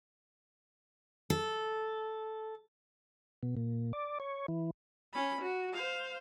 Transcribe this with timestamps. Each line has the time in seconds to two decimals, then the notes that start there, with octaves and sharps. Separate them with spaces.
1.30 A4
3.43 B2
3.57 A#2
3.93 D5
4.20 C#5
4.48 E3
5.13 C#4 B5
5.42 F#4
5.73 C5 F5